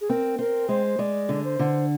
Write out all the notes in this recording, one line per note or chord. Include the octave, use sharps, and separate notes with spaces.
G#4
C4 A#4
C4 A#4
G#3 C5
G#3 D5
D3
C5
D3